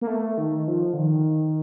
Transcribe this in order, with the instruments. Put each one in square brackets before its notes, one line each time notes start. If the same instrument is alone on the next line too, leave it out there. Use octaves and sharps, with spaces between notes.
[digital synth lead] A#3
A3
D#3
F3
D3
D#3